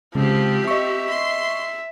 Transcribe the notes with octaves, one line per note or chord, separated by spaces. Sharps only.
C#3 F3 G#3 C4 G4
D#5 E5 C#6
C6